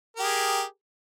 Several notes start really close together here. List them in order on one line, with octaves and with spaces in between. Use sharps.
A#4 G4 G#4